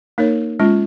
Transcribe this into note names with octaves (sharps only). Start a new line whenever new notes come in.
A#3 D#4 A#4 C#5
G#3 C#4 F4